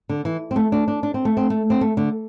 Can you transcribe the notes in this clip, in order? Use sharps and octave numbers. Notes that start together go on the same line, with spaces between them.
D3
E3
C4
A3
D4
D4
D4
C4
A3
C4
A3
C4
A3
D3